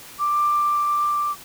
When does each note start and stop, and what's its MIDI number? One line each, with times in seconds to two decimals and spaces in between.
0.19 1.32 86